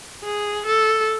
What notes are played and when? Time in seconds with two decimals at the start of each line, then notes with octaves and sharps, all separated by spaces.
0.24 G#4
0.66 A4